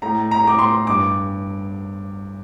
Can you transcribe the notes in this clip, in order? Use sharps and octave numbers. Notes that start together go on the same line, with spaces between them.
A2 A#5
A#5
A2 D6
C6
G2 D6